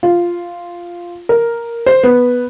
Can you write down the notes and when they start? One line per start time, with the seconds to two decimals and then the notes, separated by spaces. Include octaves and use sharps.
0.03 F4
1.29 A#4
1.86 C5
2.03 B3